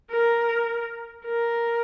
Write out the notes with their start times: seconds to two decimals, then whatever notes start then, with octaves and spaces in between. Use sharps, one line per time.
0.11 A#4
1.25 A#4